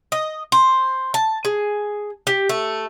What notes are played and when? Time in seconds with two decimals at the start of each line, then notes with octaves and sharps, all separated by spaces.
0.12 D#5
0.52 C5
1.14 A5
1.45 G#4
2.27 G4
2.49 A3